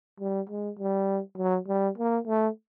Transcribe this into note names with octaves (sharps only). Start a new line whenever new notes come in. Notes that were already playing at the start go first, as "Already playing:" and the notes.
G3
G#3
G3
F#3
G3
A#3
A3